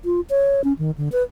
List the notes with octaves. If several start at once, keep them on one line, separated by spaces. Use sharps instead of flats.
F4
C#5
C#4
D#3
D3
B4